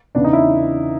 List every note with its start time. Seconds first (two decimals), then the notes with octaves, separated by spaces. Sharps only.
0.15 E2 C#3 E3 D4
0.24 D#4
0.33 E4